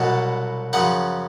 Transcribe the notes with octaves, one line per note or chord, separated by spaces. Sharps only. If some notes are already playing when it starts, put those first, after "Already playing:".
Already playing: C2 B2 F#3 A5
F#2 C#3 F3 F#5